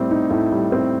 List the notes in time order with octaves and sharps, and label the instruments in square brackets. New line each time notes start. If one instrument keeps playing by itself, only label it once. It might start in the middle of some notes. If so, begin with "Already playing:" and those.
Already playing: [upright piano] A2 G3 C4
D#4
A2
G3
C4